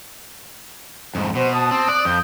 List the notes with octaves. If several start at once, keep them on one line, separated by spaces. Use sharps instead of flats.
F2 G#2
B2 C5
A5 D#6
C4
D5 F#6
F2 G6